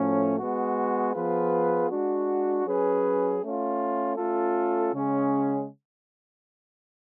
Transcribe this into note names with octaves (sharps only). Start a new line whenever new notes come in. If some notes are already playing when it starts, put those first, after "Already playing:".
Already playing: A2 F3 A3 C#4
G#3 B3 F#4
F3 B3 F4 G#4 B4
G#3 D4 F#4
F#3 C#4 G#4 B4
A3 C#4 F4
A3 C#4 F4 A4
C#3 G#3 C#4 G#4